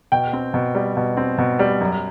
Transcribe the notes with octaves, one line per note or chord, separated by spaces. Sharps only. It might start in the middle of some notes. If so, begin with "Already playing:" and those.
B2 G5
C4
B2
G3
B2
C4
B2
G3
F#2